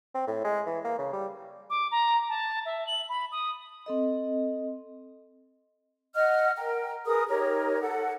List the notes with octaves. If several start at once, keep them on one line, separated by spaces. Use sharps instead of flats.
C4
A2
G#3
E3
A#3
C#3
G3
D6
A#5
A5
E5
F#7
B5
D#6
C4 A4 D#5
D#5 F#5 F6
A#4 G5
G#4 A#4 B4 D#6
D#4 G4 A#4 C#5
A4 F#5